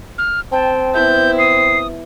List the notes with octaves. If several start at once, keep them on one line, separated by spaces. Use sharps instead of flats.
F6
C4 G5 A5
B3 E4 G6
D#6 C7